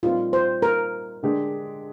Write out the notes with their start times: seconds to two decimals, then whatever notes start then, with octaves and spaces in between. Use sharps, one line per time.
0.03 A#2 G3 C4 D#4 F4
0.33 C5
0.62 A#4
1.23 D3 G#3 D4 G4